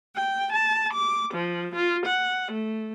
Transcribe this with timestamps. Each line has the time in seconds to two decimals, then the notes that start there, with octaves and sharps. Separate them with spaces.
0.14 G5
0.51 A5
0.93 D6
1.33 F3
1.74 F4
2.04 F#5
2.50 A3